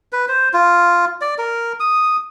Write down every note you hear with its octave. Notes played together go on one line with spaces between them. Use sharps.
B4
C5
F4
D5
A#4
D#6